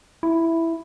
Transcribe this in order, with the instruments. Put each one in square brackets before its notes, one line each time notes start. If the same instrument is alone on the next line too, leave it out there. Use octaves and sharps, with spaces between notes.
[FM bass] E4